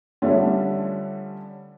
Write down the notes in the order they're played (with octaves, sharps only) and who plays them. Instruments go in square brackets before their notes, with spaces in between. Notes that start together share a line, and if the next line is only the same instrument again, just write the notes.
[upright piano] D3 F3 G3 A3 C#4 D4